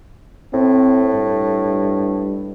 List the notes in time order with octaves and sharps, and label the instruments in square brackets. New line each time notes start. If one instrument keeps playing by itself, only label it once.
[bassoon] A2 [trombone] C4
[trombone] G2